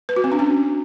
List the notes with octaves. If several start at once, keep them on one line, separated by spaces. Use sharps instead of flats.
B4
F#4
C4
D4
C#4